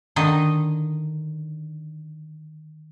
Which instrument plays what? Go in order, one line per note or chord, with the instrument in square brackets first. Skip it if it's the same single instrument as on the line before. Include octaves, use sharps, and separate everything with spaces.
[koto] D3 D#3 D#4 D#5